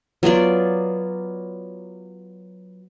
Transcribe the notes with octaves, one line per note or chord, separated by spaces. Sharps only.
F#3 B3 F4 D5